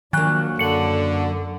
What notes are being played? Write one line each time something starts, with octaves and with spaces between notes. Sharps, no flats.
D#3 F3 F#3 A#3 D4 F#6
F#2 D3 C#7 F#7